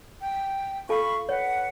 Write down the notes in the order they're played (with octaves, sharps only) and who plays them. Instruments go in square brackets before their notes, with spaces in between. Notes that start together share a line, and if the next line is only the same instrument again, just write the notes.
[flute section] G5
[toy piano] F4 A4 A5 [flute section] F5 B5 C#6
[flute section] B4 F#5 [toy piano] C#5